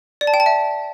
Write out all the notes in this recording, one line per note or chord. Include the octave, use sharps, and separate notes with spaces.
D5
A5
G5
A5
E5